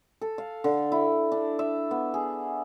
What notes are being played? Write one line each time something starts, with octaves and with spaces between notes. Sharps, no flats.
A4
F5
D3
E4
D4
E5
B3
G#4